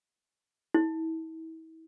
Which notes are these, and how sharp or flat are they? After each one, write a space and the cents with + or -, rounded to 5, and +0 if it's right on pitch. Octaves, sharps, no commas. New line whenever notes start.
E4 -35